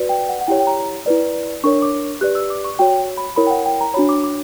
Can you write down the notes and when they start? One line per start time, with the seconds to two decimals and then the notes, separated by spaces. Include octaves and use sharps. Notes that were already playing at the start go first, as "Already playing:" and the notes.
Already playing: F#4 B4 D5
0.09 G5
0.29 F#5
0.41 F#5
0.48 E4 G4 C#5 G5
0.60 G5
0.67 A#5
1.06 E4 B4 D5
1.64 D4 A#4 C#5 C#6
1.82 D6
2.21 G4 B4 D5 F#6
2.35 E6
2.50 D6
2.65 C#6
2.79 F#4 C#5 G5
3.17 B5
3.36 E4 A#4 C#5 B5
3.47 G5
3.51 F#5
3.66 G5
3.81 A#5
3.94 D4 F#4 C#5 B5
4.09 D6
4.24 D6